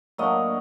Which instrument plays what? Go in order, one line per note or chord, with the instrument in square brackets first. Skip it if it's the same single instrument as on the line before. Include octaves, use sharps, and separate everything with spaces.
[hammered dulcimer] A2 F#3 A#3 D4 D#5